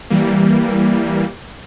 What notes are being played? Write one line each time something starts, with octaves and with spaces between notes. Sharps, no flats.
E3 G3 A#3